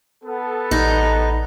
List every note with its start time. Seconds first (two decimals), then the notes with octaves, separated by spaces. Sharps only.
0.24 B3 A4
0.71 A1 D#4